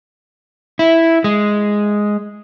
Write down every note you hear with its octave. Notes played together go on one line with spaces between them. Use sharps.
E4
G#3